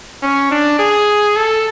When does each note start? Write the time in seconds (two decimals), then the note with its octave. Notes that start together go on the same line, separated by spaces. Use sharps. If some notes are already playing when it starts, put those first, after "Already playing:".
0.23 C#4
0.51 D4
0.79 G#4
1.36 A4